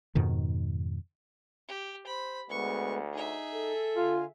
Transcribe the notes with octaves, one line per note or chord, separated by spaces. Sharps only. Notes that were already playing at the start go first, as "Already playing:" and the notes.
F2 G#2 B2 D#3
G4
C5 B5
D2 G#3 B3 B4 C#6
D#4 G#4 E5
A4
D3 F4 F5 G#5